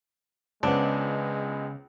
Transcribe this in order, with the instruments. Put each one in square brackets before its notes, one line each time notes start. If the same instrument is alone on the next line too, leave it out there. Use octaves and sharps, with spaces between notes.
[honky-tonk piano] C#2 B3 [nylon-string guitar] C#3 C5 F#5 [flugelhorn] G#3 [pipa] D4